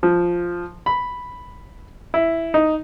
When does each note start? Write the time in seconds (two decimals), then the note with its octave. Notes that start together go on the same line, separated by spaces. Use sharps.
0.03 F3
0.86 B5
2.14 E4
2.54 D#4